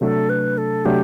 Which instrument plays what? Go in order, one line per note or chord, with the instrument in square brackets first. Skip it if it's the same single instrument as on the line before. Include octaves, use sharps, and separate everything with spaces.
[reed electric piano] C3 F#3 A3 D4 [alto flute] A4
[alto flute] B4
A4
[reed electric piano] C3 F#3 A3 D4 [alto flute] G4